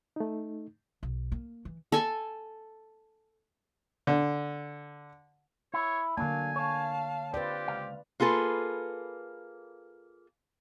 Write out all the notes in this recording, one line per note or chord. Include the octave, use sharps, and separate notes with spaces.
A3 D#4
B1
A#3
E3
A4 G#5
D3
E4 C#5
D3 F#3 A#3 D4 F5 G#5
C#5 F5 A5
C4 F4 G4 B4 D5
C#2 F5
A#3 F4 G#4 A4 B4